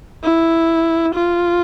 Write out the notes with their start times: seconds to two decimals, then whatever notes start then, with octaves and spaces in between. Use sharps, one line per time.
0.24 E4
1.15 F4